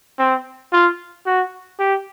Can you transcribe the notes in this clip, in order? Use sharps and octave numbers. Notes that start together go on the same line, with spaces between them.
C4
F4
F#4
G4